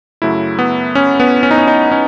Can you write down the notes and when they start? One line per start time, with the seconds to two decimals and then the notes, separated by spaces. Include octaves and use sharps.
0.22 F#2 C#3 F#3 A3 E4
0.59 B3
0.95 C#4
1.20 B3
1.43 C#4
1.51 D#4
1.58 C#4
1.68 D#4
1.92 C#4